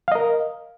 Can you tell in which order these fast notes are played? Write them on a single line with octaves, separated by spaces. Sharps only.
F5 D#5 A#4